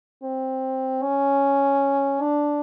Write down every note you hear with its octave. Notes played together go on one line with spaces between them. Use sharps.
C4
C#4
D4